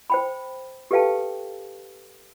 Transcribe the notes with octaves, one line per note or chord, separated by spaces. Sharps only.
C5 G5 B5
G4 A4 B4 F5 G5 A5